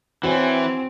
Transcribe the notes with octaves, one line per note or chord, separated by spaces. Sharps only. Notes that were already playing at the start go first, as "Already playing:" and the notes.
E3 C4 F#4 C#5 G#5